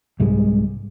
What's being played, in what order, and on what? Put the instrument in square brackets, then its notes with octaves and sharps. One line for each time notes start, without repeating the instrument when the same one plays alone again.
[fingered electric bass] C2 G#2 G3 G#3